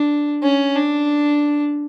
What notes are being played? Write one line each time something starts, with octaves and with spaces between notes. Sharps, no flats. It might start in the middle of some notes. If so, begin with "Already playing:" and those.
Already playing: D4
C#4
D4